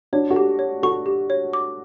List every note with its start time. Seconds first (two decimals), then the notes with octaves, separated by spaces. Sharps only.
0.13 D4 F#4 C#5
0.30 F#4 A4
0.36 G4
0.59 C#5
0.83 F#4 A4 C#6
1.06 G4
1.30 C#5
1.53 D6